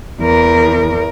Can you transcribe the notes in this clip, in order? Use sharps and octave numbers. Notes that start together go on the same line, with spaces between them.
E2 A#4